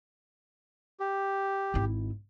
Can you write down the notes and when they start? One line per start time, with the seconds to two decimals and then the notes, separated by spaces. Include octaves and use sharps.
1.00 G4
1.74 G#1 E4